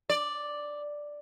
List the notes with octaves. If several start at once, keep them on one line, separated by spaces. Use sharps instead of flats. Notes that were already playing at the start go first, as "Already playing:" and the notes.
D5